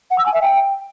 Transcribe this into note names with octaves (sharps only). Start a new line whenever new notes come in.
F#5
E6
G#5
E5
G5